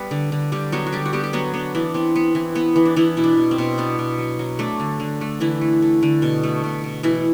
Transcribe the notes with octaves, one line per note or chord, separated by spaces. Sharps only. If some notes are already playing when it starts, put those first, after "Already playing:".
Already playing: G3 B3 B4
D3
D3
D3 G3 G4
F#3 B3 F#4
F#4
D3 G3 G4
F#4
G3 B3 G4
G4
F#3 B3 F#4
B3 D4
E3 D4
B3 C4
B3
E3
B3
E3
D4
E3 B3 E4
B2 E4
D4
B2
C4
B2
B3 D4
B2
F#3
F#3
A3 D4
D3
D3
A3
D3 E3 E4
A3
A3
D3
B2
A3
B2
B2
B2 E3 E4